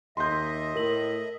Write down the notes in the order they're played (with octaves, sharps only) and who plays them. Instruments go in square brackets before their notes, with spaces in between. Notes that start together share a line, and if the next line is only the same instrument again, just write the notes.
[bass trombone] D#2 [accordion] D#5 E5 [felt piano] C6 G6
[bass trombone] A2 [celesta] A#4 F#7